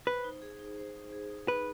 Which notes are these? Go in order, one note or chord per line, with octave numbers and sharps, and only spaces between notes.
B4 C5
D#4
G#4
D#4
C5
D#4
G#4
D#4
D#4 B4